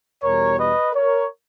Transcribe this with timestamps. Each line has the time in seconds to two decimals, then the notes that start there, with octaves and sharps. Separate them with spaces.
0.23 E2 B2 G3 A#4 C#5
0.58 B4 D#5
0.93 A#4 C#5